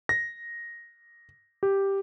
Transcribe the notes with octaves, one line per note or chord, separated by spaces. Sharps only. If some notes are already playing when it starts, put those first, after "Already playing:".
A#6
G4